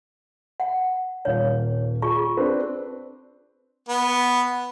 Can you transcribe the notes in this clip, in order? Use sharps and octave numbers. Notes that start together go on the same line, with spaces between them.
F#5
D#1 C#5 F5
F4 G#4 C#6
C4 D4 B4
B3